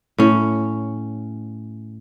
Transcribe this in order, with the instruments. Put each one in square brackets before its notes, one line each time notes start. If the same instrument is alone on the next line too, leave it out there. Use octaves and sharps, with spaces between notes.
[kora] A2 C#4